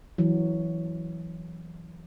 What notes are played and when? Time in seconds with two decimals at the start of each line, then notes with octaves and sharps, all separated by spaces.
0.18 E3 F#3